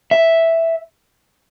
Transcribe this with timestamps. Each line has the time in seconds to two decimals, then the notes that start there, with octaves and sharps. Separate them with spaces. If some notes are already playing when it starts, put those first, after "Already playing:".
0.11 E5